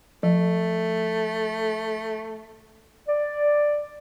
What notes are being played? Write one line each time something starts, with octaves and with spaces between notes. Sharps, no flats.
F3 A3
D5